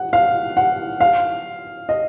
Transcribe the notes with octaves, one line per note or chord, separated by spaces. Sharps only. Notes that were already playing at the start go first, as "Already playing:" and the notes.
Already playing: F#5
F5
F#5
F5
D#5